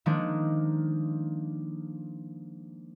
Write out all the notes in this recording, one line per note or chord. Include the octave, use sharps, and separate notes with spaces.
D#3 F3 G#3 A#3 D4